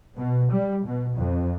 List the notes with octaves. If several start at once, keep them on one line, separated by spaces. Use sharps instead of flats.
B2
G3
B2
F2